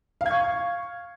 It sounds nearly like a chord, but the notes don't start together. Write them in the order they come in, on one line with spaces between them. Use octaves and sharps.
F5 G#6 C#6